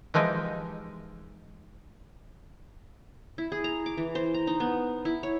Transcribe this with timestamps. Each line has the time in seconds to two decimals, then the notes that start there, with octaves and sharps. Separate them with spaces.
0.14 E3 F3 G#3 D#4 G4
3.38 E4
3.52 G#4
3.64 A#5
3.86 D6
3.97 E3
4.15 C5
4.34 A#5
4.47 D#4
4.60 B3
5.05 E4
5.23 C#5